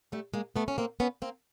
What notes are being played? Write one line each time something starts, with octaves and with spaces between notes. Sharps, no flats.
G3 A3
G#3 A#3
A3 B3
C#4
A#3 C4
B3 C#4
A#3 C4